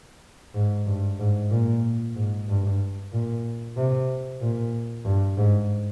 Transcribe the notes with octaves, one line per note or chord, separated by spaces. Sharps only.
G#2
G2
G#2
A#2
G#2
G2
A#2
C3
A#2
G2
G#2